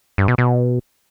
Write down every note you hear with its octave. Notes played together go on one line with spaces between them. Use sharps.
G2
B2
B2